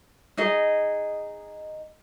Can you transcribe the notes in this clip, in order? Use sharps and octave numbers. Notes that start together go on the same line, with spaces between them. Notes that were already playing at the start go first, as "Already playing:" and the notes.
D#4 G#4 D#5